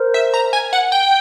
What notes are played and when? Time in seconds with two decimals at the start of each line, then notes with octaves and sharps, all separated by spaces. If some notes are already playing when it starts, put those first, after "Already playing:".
Already playing: A#4 C5
0.14 E5
0.34 A#5
0.53 G#5
0.73 F#5
0.92 G5